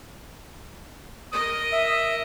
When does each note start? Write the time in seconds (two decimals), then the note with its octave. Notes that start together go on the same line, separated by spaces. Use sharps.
1.32 A#4 D#5 D#6
1.72 E5